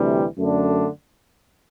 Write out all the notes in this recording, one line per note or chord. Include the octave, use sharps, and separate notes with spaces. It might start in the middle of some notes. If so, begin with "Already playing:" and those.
Already playing: D2 C3 E3 G3
F#2 D3 A3 D4